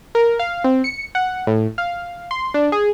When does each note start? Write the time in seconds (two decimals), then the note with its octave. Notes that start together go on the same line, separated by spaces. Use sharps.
0.15 A#4
0.39 F5
0.64 C4
0.84 C#7
1.15 F#5
1.47 A2
1.78 F5
2.31 C6
2.54 D4
2.72 G#4